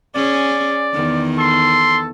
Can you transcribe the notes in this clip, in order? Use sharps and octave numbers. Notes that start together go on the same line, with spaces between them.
C#4 G#4 D5
E2 D#3
A4 C6